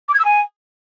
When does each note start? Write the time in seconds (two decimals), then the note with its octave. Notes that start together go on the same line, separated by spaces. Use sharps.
0.08 D6
0.14 G#6
0.19 E6
0.25 G#5